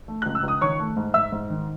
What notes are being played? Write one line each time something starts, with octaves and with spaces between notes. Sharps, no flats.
A3
C#2 F#6
E6
C#2
D#6
D#3 C#5 C#6
A3
G#2
G#2 E5 E6
G#2
D#3